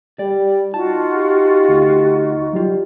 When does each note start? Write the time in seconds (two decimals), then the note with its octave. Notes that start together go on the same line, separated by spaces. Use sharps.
0.19 G3 D5
0.74 D#4 F4 F#4 A5
1.14 G4
1.69 D2
2.53 F#3 G3 F4